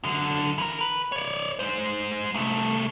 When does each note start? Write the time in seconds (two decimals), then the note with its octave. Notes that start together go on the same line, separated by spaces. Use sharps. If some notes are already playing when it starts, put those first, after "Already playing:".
0.03 F#2 D3
0.58 E3 A#4
0.81 B4
1.12 C#5 D5
1.59 G#3 C5
2.34 C2 A3